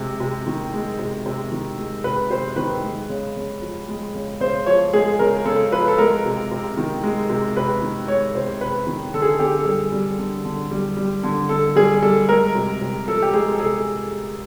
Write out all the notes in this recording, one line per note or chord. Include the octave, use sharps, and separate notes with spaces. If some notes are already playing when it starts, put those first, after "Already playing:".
Already playing: C3 G#3
C3
D#3
G#3
C3
C3
D#3
G#3
C3 B4
C3 C5
D#3 B4
G#3
C#3
C#3
F3
G#3
C#3
C#3 C5
F3 C#5
G#3 G#4
C#3 A#4
C#3 A4
F3 B4
A4
G#3 A#4
C3
C3
D#3
G#3
C3
C3 B4
D#3
G#3 C#5
C3 C5
C3 B4
D#3
D3 A4
G#4
A4
D3 G4
A4
G3 G#4
G3
D3
D3
G3
G3
D3
D3 A4
G3 G#4
G3 A4
G#3 A#4
C3
C3
F3 A4
G4
G#3 G#4
A4
C3 G#4